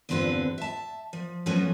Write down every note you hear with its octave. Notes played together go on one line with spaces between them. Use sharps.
E2 G2 D3 C4 F4 B4
E5 A5
F3
F3 F#3 A3 B3 C#4 F#4